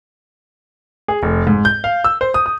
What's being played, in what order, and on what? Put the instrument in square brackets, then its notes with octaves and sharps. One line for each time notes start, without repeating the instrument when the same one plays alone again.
[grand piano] G#4
F1
G#2
G6
F5
E6
C5
D#6
D#6